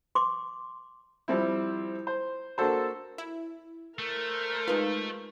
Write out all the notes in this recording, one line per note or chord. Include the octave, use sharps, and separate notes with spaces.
C6 D6
F3 G3 C4 E4
C5
A#3 D4 F#4 A4 C5
E4
A3 A#4 C5
G#3 D#4 F4 B4